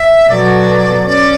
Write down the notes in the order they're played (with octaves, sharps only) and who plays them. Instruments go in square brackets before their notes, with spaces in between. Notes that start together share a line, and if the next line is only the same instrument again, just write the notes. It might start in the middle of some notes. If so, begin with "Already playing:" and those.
Already playing: [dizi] E5
[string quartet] B2 F#3 B3 F#4 A4 [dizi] D5
[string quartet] C#4 [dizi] D5